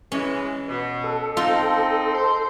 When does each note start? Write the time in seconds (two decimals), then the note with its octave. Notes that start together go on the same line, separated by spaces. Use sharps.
0.12 E3 G#3 C#4
0.68 B2
1.04 A4
1.37 C4 D#4 F4
2.14 C5